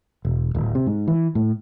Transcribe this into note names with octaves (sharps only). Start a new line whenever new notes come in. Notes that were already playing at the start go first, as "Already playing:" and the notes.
E1
D1
C3
G#2
E3
A2